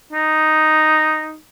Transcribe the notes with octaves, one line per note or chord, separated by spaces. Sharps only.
D#4